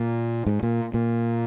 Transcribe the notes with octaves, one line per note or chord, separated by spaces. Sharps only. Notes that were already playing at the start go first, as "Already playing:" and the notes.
Already playing: A#2
G#2
A#2
A#2